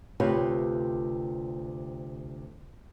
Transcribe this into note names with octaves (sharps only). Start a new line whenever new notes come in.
D2 C3 F4 G4 B4 C#5